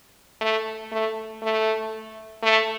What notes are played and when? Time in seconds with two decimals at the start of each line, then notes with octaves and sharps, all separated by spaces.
0.41 A3
0.92 A3
1.42 A3
2.42 A3